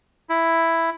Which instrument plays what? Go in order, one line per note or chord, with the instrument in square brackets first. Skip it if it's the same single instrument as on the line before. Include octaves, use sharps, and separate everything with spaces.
[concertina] E4